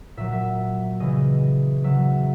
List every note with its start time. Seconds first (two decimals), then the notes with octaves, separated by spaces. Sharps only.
0.17 A#2 F#3 E5
0.32 E5
1.00 C#3 E3 D#5
1.84 C#3 F#3 E5